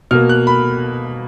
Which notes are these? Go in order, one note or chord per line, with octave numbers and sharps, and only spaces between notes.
B2 A#3 F6
F#6
B5